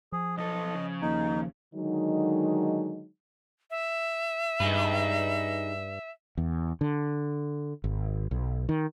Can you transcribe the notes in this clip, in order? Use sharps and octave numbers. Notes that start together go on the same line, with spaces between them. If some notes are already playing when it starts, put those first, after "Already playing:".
F3 G#4
B1 A4 D#5
C#3
D#2 D#4
D3 D#3 F#3 G#3 D#4
E5
G2 D#4 G#4 B4
E2
D3
G#1
B1
D#3